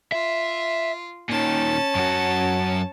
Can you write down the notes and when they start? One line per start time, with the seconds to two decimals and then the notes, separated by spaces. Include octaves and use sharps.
0.12 F4 E5
1.30 A#2 D#3 C#4 A5
1.95 F#2 F#4